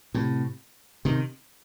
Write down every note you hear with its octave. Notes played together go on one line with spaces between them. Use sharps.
A2 C3
C3 D#3